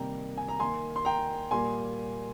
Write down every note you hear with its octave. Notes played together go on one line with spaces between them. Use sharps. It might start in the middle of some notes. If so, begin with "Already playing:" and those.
Already playing: C3 D#3 G3 A#3 G5 A#5
G#5
A#5
D#3 A#3 G#5 C6
C6
G5 A#5
A#2 G3 A#3 G#5 C6